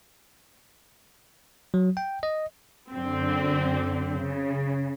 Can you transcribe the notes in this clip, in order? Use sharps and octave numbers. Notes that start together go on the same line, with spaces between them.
F#3
G5
D#5
F#2 D3 C4
C#3